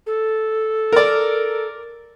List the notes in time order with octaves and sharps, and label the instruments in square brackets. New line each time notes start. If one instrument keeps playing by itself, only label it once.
[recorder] A4
[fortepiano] A#4 D5